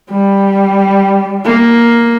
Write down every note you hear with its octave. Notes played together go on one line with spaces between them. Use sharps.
G3
A#3